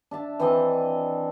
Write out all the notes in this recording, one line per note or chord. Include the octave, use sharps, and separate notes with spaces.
D4 E5 A5
E3 C4 D4 D#5